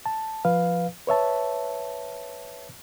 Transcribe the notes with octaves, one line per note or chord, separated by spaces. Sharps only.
A5
F3 B4 F5
B4 C#5 E5 A5